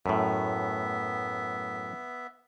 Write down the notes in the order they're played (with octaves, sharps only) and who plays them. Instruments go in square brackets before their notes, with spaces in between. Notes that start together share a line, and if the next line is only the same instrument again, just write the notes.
[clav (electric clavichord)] F#2 A2 [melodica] B3 E5